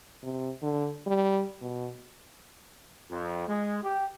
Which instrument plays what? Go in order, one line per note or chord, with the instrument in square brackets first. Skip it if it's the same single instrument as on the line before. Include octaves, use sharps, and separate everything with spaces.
[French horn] C3
D3
G3
B2
[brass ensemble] F2
G#3
G4